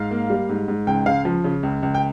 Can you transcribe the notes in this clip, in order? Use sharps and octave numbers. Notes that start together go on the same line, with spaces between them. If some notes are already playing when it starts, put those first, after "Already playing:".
Already playing: G#2 F5
A#3
G3
G#2
G#2
C#2 G5
C#2 F5
F3
C#3
C#2
C#2
G5